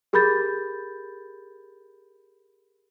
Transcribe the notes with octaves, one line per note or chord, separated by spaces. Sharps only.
G4 G#4 A#4 B5 G6 A6